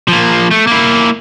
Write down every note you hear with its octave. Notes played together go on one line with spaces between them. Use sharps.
F3 A#3
A3
A#3 E4